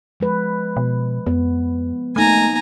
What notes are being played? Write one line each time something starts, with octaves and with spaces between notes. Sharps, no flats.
F3 G#3 B4
B2
F2 B3
A3 A#3 D#4 G#5 A#5